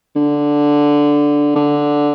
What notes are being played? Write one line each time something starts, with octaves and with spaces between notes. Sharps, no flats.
D3
D3